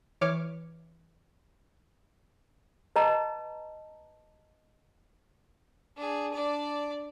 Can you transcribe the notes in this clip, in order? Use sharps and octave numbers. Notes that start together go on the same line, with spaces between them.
E3 C#5 D6 F6
B4 D#5 A5 A#5
D4 G#4
D4 D5